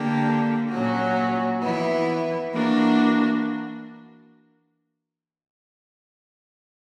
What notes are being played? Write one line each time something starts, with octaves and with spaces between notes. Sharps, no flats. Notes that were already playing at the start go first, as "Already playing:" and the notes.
Already playing: D3 A#3 D4 G4
A#2 F#3 C#4 F#4
E3 B3 E4
E3 A#3 D4 F#4 A#4